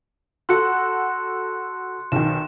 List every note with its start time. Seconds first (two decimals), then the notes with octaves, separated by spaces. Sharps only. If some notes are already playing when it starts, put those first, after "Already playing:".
0.49 F#4 A4 F#5 C6 F#6 C#7
2.12 B1 D#3 E7